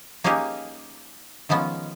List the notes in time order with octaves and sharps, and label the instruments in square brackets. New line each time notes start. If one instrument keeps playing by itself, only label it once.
[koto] A#3 C#4 D#4 G4 G#4
D#3 F3 G#3 B3 C#4